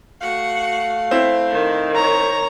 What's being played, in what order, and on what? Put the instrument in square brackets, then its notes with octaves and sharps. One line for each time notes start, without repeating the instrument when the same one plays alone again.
[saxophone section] A3 F5 [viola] F#4 F#5
[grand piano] C4 E4
[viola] D#3
[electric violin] C#5 A#5